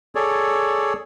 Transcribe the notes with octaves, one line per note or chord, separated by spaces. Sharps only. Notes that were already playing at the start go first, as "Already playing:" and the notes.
G#4 A4 C#5 D5